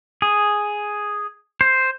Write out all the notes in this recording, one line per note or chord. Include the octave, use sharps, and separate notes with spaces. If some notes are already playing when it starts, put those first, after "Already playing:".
G#4
C5